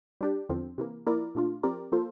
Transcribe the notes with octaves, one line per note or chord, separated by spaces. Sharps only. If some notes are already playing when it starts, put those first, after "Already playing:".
G3 D4 G4
E2 D3 F3 C4
C3 E3 A#3
F3 A#3 E4 A#4 D5
A#2 A3 D4 F4
F3 C4 G4 A#4 D5
F3 A#3 F4 A4 C5